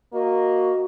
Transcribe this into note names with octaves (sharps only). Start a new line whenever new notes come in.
A#3 F#4 D#5